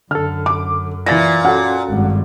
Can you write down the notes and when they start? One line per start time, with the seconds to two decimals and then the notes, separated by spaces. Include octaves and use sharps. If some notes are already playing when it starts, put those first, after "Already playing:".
0.11 F#2 D3 A4 F6
0.46 D6
1.06 A#2 E3 A6 A#6
1.45 C#4 F#4 A4 F#5
1.89 G#1 G2